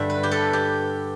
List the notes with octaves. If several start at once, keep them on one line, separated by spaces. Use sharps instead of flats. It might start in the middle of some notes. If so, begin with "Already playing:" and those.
Already playing: G2 D3 G3 E5
B4
G4
A4
G4